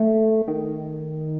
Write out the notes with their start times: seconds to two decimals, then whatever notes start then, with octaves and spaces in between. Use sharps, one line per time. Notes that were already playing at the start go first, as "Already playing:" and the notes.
Already playing: A3
0.48 D#3